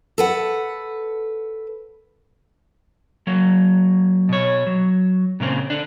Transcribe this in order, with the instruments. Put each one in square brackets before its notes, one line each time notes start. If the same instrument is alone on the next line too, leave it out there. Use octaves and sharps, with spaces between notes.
[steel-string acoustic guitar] A4 B4 F#5
[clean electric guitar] F#3 A#3
B2 C#5
F#3
A#2 C#3 A#3 C4
D3 D4